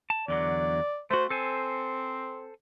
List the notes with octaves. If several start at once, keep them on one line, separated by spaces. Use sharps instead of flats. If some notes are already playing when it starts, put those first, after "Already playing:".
A5
E2 D3 F#3 D5
A3 F#4 C5
C4 A4 C5 G#5